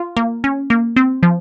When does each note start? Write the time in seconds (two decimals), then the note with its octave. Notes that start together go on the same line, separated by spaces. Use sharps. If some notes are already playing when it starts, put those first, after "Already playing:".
Already playing: F4
0.17 A#3
0.44 C#4
0.70 A#3
0.96 C4
1.23 F3